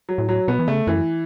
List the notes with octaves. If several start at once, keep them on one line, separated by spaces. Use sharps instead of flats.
F#3
A2
F#3
B2 B3
E3
C#3 A3
F#2 E3